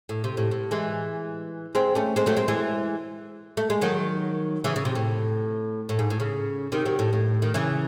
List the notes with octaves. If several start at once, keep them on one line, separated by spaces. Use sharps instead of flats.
A2
C3
A2
A2
E3 G#3
G#3 C4
A3 C#4
G#3 C4
F#3 A3
G#3 C4
E3 G#3
A3
G#3
D#3 F#3
C#3 E3
C#3
C3
A2
A2
G#2
A2
C#3
C3 D#3
D#3 F#3
A2
A2
D#3
C#3 E3